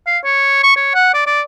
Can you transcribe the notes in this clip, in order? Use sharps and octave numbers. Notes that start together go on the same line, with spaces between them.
F5
C#5
C#6
C#5
F#5
D5
D5